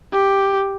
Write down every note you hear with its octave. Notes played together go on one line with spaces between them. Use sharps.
G4